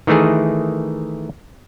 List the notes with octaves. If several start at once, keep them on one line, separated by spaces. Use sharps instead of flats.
D#3 E3 A3 D#4 G#4